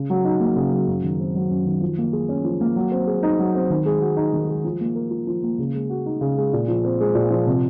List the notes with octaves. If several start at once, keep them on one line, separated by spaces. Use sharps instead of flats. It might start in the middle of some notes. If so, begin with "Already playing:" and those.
Already playing: C#3
F#3
D#4
A#3
C#3
F#3
F#2
D#3
C4
F#3
F#2
D#3
F3
A#3
G#4
C#4
F3
A#3
F#3
C4
G#4
D#4
F#3
C4
D#3
G#3
F#4
D#4
D#3
G#3
F3
A#3
A#4
F4
F3
A#3
C#3
G#3
F#4
D#4
C#3
G#3
A#2
F3
C4
G#3
A#2
F3
C3